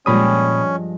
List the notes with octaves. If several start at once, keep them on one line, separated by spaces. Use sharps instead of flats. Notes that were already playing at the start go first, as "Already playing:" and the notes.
G2 A#2 F3 G#3 C#4 B5 D#6